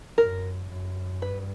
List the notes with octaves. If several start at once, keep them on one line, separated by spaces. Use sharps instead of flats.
F#2 A#4
F#2
G2 B4